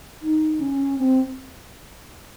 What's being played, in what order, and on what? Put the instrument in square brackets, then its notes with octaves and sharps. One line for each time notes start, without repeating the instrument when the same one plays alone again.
[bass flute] D#4
C#4
C4